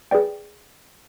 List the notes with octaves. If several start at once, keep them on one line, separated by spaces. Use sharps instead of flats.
G#4 B4 D5 G5